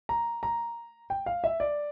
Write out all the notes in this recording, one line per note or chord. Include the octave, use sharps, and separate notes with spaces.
A#5
A#5
G5
F5
E5
D5